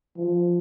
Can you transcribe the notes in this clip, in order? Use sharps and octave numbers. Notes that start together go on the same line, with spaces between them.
F3